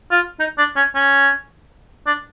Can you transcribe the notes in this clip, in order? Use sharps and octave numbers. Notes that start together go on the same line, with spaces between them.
F4
D#4
D4
C#4
C#4
D4